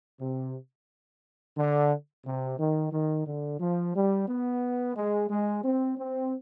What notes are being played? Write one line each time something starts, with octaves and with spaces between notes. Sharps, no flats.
C3
D3
C3
D#3
D#3
D3
F3
G3
B3
G#3
G#3
C4
C4